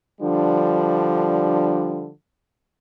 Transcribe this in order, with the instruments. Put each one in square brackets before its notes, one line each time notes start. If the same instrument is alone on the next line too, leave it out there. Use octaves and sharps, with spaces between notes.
[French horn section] D3 F3 G3 D4